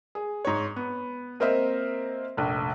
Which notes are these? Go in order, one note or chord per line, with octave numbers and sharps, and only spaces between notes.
G#4
G#2 C#5
B3
A#3 C4 A#4 C5 D#5 E5
F1 A#1